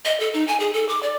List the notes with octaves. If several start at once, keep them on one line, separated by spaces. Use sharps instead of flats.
D#5
A4
D#4
G#5
G#4
A4
D6
D5